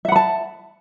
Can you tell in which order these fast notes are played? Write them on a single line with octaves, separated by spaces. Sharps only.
E5 F#5 B5 A5